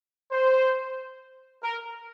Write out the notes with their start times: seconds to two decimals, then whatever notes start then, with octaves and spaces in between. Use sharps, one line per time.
0.32 C5
1.63 A#4